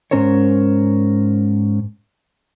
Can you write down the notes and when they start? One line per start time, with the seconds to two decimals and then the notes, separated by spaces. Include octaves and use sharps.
0.11 G#2 F3 C#4 A#4 C5 C#5